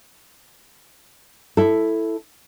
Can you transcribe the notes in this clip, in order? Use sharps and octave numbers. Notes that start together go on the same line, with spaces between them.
E4 A4